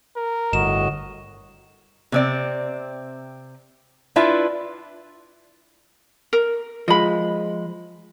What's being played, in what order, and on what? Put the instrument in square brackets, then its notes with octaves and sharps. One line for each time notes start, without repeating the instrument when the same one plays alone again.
[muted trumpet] A#4
[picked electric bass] G1 [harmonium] A2 F#4 D#5 [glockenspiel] E7
[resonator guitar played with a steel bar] C3 C4 D5
D4 E4 F4 B4 E5
[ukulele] A#4
[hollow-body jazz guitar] F3 G#3 [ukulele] D#5 B5